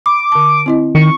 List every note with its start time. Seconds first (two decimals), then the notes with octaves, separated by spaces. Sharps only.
0.06 B5 D6
0.32 D3 A5
0.66 C4 E4 D#5
0.95 D#3 C#6